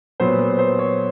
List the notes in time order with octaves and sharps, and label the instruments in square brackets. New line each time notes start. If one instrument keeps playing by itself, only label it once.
[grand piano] A#2 F#3 B3 C5
B4
C5
C#5